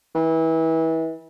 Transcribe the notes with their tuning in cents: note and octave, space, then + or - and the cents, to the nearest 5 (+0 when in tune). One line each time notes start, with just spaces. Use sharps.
E3 -30